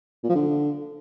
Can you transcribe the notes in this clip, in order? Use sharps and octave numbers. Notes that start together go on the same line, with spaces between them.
A#2
F3
D3